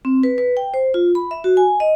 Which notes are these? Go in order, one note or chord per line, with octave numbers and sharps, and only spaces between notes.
C4
B4
B4
G5
C5
F4
B5
E5
F#4
G#5
D#5